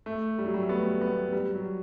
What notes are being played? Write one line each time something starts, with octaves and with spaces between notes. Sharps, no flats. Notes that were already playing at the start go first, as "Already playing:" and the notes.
A3
G3
F#3
G3
A3
B3
B3
G3
F#3